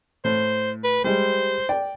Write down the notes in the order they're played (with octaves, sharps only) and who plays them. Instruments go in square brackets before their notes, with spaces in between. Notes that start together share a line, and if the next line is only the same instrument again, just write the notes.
[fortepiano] A2 [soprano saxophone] C5
[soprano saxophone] B4
[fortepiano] G3 G#3 [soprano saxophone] C5
[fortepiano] D5 G5